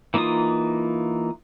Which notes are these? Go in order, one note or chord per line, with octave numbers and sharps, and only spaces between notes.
E3 A#3 D#4 F4 D#6